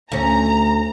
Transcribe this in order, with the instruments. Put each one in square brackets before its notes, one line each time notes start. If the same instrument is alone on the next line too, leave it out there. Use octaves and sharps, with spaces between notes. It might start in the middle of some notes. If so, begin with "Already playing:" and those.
[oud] D2 C#4 [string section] A#5